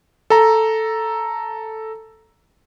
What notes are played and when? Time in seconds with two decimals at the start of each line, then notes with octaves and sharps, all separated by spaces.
0.30 A4 A#5